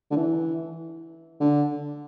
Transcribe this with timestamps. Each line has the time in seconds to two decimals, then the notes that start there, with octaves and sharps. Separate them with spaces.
0.11 D3
0.16 E3
1.40 D3